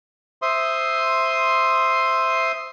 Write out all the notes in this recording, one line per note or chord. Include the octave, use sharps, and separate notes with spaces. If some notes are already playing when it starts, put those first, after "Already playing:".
C5 E5 C6 D#6